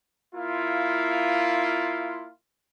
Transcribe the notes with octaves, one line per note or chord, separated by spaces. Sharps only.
A#3 E4 F4